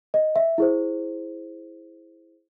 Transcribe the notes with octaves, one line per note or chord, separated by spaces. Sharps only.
D#5
E5
E4 G#4 C5